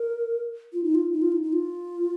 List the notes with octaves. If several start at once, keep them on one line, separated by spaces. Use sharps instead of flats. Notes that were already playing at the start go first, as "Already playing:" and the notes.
Already playing: A#4
F4
D#4
F4
D#4
F4
D#4
D#4
F4